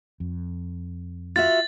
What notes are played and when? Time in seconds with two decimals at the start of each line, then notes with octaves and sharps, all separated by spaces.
0.20 F2
1.36 F4 F#4 E5 A6